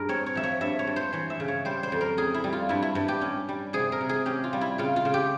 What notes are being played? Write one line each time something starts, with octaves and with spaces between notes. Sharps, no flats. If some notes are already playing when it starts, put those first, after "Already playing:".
Already playing: G2 G#4 A#4
C4 C#5
C#5
F3 E5
C#5
G2 E5
C#5
G2
C5
E3 C#5
E5
C#3
C#5
G3 C5
C5
F2
A#4
C#4 G#4
E4
G3
F4
G2 E4
E4
G2
G4
C#4
G3
C3 G#4
A#4
C3
G#4
C#4 G4
F4
G3
E4
C#3 F4
F4
C#3
G4